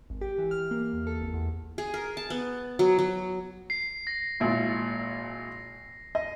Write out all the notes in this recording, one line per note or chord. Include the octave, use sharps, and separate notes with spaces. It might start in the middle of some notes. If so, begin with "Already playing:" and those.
G#1
G4
E3
F6
A#3
E2
A4
G#1
E2
G#4
A#4
A5
B3
F#3
F#3
C7
A#6 C7
G#1 A#2 E4
D#5